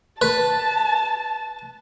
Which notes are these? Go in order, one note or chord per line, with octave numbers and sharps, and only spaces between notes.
B4 A5